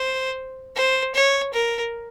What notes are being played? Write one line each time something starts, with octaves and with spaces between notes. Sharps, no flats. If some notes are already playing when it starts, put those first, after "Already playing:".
Already playing: C5
C5
C#5
A#4